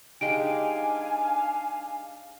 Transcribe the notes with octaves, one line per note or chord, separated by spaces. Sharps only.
G#3 D4 D#4 G4 F5 G#5 D7